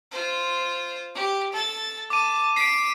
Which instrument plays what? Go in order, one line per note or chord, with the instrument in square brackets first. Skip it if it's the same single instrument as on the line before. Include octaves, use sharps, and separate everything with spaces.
[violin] F4 C5
G4
A4 A6
[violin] A5 [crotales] D6 D#7
[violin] B6 [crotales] C7 D7